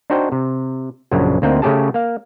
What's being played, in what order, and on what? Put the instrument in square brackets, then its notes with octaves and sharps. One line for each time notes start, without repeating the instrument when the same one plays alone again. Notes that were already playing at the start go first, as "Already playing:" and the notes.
[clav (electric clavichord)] D4 D#4 F#4 C5 G5
C3
A#1 F#2 A#2 C#3 D4
D2 A#3 C4 D#4 G5
C#3 A3 C#4 G4 G#4 A5
A#3 F5